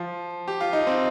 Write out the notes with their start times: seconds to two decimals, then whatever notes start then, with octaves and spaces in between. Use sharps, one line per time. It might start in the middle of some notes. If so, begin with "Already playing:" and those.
Already playing: F3
0.48 G4
0.61 F4
0.73 D#4
0.87 C4